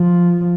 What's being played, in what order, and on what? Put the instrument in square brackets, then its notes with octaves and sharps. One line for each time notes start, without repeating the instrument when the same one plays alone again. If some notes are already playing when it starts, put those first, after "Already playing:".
Already playing: [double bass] F3